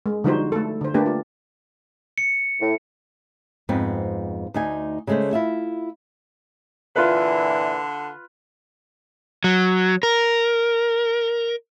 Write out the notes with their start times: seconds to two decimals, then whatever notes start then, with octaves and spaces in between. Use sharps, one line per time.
0.06 G#3
0.24 D3 F3 G3 D#4 F#4 C5
0.52 A3 A4
0.81 D3 C5
0.94 A3 A#3 D4 G4 B4
1.06 F4
2.18 C#7
2.61 A2
3.69 F2 G#2 B3 C4
4.54 D2 D#4 G#5
5.07 C#3 F#3 G#3 A3 C5
5.33 E4 F4 E5
6.96 A#2 D3 E3 F4 B4
9.44 F#3
10.03 A#4